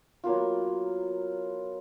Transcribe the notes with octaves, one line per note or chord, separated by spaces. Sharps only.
F#3 A#3 B3 F4